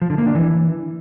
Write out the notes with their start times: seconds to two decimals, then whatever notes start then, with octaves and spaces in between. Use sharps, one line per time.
0.02 F3
0.10 D3
0.18 A#3
0.27 D4
0.35 E3